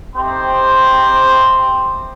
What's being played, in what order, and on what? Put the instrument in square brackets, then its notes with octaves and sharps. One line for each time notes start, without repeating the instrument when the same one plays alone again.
[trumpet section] A3 C4 D#4 G4 C5